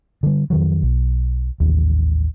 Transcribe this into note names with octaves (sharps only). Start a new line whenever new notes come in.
D3 G3
F2 D#3 F#3
B1
A1 D#2